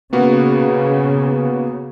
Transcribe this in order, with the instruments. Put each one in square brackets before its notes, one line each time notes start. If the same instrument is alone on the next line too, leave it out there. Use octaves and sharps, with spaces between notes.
[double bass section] C#3 [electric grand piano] A#3 B3 F#4